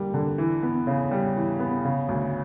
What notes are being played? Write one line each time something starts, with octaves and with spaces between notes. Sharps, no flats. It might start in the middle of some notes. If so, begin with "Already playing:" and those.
Already playing: D3 G3 A#3
D3
E3
B3
C#3
G3
E3
B3
C#3
D2